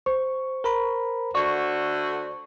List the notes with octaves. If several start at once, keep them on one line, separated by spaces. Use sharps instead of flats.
C5 C#6
A#4 A#5 B5
D3 A3 F#4 D5 C#6